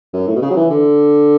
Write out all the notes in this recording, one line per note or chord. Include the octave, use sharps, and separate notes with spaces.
F#2
A2
B2
C#3
F#3
E3
D3